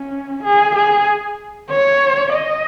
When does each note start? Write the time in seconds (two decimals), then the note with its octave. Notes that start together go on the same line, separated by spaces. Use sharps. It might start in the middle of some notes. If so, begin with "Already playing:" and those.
Already playing: C#4
0.44 G#4
0.76 G#4
1.70 C#5
2.33 D#5